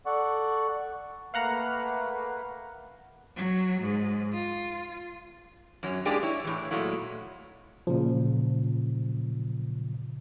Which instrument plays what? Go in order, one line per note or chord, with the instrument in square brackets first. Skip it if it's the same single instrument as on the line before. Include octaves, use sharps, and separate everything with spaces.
[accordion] A4 D5 F#5 C#6
[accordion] A3 A#3 [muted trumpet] B4 [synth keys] F5 F#5 A#5
[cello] F#3
G#2
F4
[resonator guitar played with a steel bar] F#2 F#3 C#4
A2 G#3 A#3 D4 G4 G#4
E4 C#5
A2 E3
A#2 F#3 G#3 A3 E4
[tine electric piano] A#2 C#3 F3